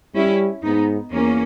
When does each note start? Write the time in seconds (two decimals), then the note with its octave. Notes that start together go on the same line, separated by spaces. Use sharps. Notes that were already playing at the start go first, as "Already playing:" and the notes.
0.15 G3 C#4 E4
0.63 G#2 B3 D#4
1.11 E2 A#3 C#4